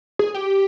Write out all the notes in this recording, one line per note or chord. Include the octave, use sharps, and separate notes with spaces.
G#4
G4